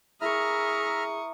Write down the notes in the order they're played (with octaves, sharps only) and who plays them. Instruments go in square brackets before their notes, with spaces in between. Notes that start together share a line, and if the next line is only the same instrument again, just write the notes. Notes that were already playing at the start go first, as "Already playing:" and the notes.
[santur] E4 A#4 [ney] G#4 [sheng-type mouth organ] E5 A#5 F6 [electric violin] C#6 D#6